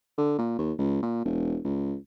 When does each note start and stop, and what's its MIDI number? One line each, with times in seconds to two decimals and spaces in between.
0.18 0.34 50
0.38 0.55 46
0.58 0.73 39
0.78 1.01 37
1.03 1.21 46
1.25 1.59 28
1.64 1.95 37